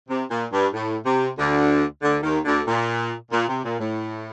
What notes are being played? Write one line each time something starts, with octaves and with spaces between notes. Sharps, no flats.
C3
A#2
G2
A2
C3
D2 D3
D2 D3
D#2 D#3
D2 D3
A#2
A#2
C3
A#2
A2